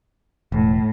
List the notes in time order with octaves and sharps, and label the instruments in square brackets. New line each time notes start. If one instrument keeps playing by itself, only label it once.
[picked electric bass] E1 [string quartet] A2